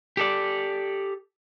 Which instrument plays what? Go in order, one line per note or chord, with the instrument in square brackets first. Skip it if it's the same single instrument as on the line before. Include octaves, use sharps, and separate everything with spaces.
[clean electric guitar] G4 A4 D5